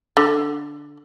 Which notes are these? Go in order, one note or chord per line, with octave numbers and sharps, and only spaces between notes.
D3